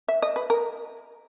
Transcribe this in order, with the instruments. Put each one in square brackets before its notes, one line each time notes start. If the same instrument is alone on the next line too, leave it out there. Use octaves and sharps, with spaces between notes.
[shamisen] E5
D#5
B4
A#4